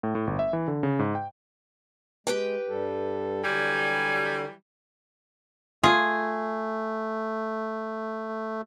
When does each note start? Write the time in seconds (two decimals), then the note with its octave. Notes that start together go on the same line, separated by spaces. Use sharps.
0.03 A2
0.15 A2
0.27 G1
0.39 E5
0.53 E3
0.68 D3
0.83 C#3
0.99 G#2
1.15 G5
2.27 G#3 G4 B4 G5
2.68 G2 G3 A4
3.44 D3 E3 F#3 G3 G#5
5.84 A3 F4 G#4